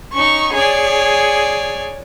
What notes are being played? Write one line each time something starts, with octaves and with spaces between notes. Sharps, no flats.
C#4 D#4 C#6
G#4 C#5 D5